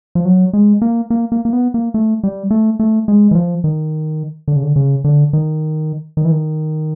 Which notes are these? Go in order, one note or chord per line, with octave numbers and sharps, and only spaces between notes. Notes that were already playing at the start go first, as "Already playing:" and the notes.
F3
F#3
G#3
A#3
A#3
A#3
A#3
B3
A#3
A3
G3
A3
A3
G#3
E3
F3
D#3
D3
C#3
D3
C#3
D3
D#3
D#3
E3
D#3